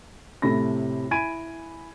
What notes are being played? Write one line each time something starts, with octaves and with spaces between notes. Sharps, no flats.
A2 C3 A4 B5 A#6
E4 G#5 B5 G#6 D7 D#7